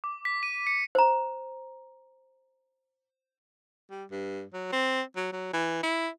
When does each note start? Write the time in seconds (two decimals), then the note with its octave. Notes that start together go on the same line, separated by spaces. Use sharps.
0.04 D6
0.25 B6
0.43 D#7
0.67 C#7
0.95 C5 A#5
3.91 G3
4.11 G2
4.53 F#3
4.72 C4
5.16 F#3
5.33 F#3
5.53 E3
5.83 E4